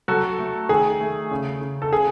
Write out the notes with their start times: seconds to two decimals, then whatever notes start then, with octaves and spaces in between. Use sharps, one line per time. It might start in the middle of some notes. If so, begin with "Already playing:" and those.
0.08 F#3 F#4 A4
0.39 A3
0.69 D#3 G#4
1.01 A3
1.31 C#3
1.61 C#3
1.82 A4
1.92 C#3 G#4